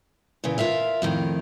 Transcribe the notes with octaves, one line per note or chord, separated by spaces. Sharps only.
A#2 C#3 E3
F4 A#4 E5 F5
F2 A2 D#3